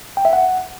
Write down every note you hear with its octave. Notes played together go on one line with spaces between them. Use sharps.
G5
E5
F#5